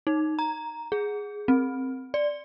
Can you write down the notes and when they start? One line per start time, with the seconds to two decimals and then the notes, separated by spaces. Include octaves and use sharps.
0.07 D#4
0.39 A#5
0.92 G#4
1.48 C4
2.14 D5